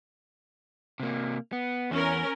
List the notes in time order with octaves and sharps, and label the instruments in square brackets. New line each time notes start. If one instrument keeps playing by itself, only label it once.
[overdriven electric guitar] C3 A#3
B3
[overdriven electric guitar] E2 [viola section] C#4 A#4